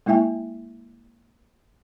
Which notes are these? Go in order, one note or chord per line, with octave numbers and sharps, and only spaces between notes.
G#3 A#3 E4 E5 G5 G#5